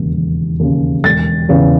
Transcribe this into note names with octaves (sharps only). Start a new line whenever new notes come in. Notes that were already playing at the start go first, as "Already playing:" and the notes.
Already playing: E1 D#2 C#3
E1
D#2 C#3
E1 A6
E2 C#3 E3